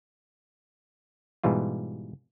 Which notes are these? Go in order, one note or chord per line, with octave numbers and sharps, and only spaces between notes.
G#2 B2 E3 G3 F4